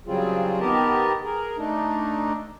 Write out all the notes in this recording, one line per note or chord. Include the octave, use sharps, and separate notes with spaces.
C#3 F#3 G3 C4 F4 G#4
D#3 B3 G4 A#4 D#5 A5
G#4 A#4
A3 D4 D#4